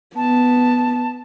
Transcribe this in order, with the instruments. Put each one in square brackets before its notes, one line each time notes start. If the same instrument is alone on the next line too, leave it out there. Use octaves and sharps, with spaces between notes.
[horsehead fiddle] B3 [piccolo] A5